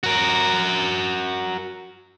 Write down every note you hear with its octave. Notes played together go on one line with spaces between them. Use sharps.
F#4 A#4